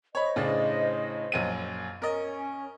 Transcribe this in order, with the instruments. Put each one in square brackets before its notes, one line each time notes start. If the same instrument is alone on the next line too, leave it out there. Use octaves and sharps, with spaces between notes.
[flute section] C5 D#5 [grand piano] C#5 B5
[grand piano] A2 C#3 D4
A#1 F#2 D#7
[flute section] C#4 [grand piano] A#4 D#5